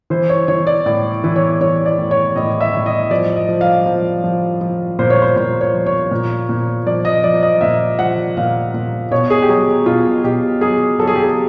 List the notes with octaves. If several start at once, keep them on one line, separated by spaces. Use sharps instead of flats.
E3 C5
C#5
E3 C#5
D5
A2 D5
E3
C#5
E3 C#5
D5
A2
C#5
A2 D#5
E5
A2
D#5
F3 D5
D#5
F3
F5
F3
F3
F3
A#2 C5
C#5
C5
A#2 C5
C#5
F3
C#5
A#2
A#2
F3 D5
D#5
F3 D5
D#5
A#2 E5
F3 F#5
A#2 F5
A#2
B2 C#5
G#4
G4
F#3 G#4
B2 F4
B2 G4
F#3 G#4
F#3 A4
G#4
G4
G#4